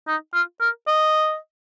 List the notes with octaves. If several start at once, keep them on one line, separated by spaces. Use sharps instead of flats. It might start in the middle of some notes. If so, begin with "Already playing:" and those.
D#4
F4
A#4
D#5